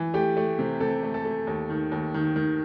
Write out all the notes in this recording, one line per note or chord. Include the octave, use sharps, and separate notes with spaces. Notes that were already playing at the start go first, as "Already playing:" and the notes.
Already playing: E3
A3 G4
A3
C3
C3 A4
A3
A4
A3
D#2
D#3
D#2
D#3
D#3